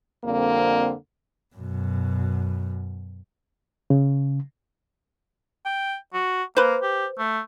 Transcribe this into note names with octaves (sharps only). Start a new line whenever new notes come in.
F2 D3 G3 A#3 C4
F#2 B2
C#3
G5
F#4
A#3 B4 C5
G4
A3